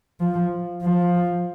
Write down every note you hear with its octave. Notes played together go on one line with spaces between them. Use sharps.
F3
F3